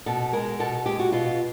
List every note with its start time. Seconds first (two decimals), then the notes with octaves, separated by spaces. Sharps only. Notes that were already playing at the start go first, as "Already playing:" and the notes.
0.06 B2 A4
0.33 G#3 A#4
0.59 B2 A4
0.86 G#3 G4
0.99 F#4
1.12 B2 F4